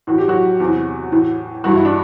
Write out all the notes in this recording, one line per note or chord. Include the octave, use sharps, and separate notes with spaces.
A2 E3 F#4
G4
F#3 F#4
E2 C3 E3
A2 E3
G2 E3 F#4
E4
D4